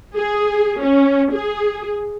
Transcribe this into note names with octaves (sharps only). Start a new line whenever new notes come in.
G#4
C#4
G#4